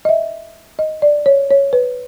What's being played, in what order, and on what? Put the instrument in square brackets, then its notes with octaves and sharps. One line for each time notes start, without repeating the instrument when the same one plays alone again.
[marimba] D#5
E5
D#5
D5
C#5
C#5
B4